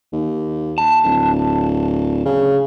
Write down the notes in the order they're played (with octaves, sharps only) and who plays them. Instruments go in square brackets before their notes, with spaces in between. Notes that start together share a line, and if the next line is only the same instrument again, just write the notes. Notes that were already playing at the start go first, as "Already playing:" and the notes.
[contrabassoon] D#2
[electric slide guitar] A5
[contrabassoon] D1
C#3